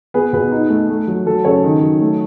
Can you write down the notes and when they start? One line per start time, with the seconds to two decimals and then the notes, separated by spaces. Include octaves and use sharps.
0.14 B3 G#4 B4
0.33 B2 G#4 B4
0.52 D#4
0.70 A3
0.89 A3
1.07 F#3
1.26 F#3 A4
1.44 C#3 A4 C#5
1.64 D#3
1.82 F#3
2.01 A3